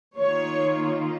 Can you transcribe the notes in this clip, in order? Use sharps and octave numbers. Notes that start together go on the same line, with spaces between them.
D#3 A#3 F4 C#5